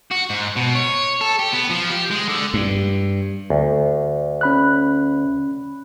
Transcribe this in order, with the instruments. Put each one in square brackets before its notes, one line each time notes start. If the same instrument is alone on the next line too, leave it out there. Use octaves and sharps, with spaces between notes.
[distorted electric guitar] F#4
G#2
B2
C#5
A4
G4
B3
F3
G4
G#3
D3
[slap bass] G2
[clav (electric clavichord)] D2
[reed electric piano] C#4 B5 F#6